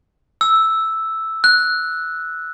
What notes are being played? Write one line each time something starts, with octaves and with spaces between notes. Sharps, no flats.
E6
F#6